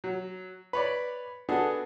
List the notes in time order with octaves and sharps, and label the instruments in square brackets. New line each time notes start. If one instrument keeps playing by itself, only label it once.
[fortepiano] F#3
B4 C#5 D5
B3 D4 F#4 G#4 A4